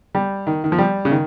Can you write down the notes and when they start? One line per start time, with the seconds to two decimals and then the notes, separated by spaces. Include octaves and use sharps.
0.15 G3
0.47 D#3
0.64 D#3
0.72 F3
0.78 G3
1.05 C#3
1.11 D#3